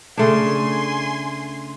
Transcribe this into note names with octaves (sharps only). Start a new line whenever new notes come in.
C#3 A3 D4 G#5 C6